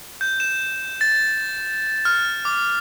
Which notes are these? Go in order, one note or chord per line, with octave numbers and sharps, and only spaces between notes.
G6
E7
A6
F6
D6